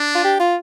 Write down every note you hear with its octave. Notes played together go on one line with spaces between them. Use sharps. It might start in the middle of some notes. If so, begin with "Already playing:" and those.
Already playing: D4
F4
G4
F4